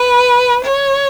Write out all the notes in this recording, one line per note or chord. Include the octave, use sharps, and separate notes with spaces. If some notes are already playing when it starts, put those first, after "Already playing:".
Already playing: B4
C#5